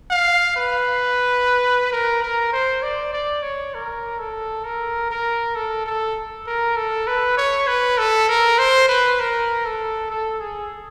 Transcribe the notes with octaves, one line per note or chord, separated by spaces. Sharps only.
F5
B4
A#4
A#4
C5
D5
D5
C#5
A#4
A4
A#4
A#4
A4
A4
A#4
A4
B4
C#5
B4
A4
A#4
C5
B4
A#4
A4
A4
G#4